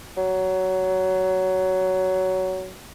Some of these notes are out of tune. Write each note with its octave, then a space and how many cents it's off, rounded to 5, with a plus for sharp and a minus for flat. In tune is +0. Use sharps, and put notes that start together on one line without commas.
F#3 +15